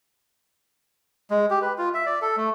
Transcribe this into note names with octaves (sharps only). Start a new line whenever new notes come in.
G#3
G4
B4
F4
E5
D5
A4
A3